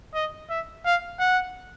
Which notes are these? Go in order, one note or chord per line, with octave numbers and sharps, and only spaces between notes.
D#5
E5
F5
F#5